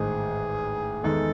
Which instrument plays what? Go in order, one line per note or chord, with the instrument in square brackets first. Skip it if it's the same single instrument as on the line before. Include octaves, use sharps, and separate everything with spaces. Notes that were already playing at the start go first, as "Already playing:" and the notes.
Already playing: [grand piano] A1 G#2 D#3 [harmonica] G#4
[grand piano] E2 D#3 G#3 D#4 [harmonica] A4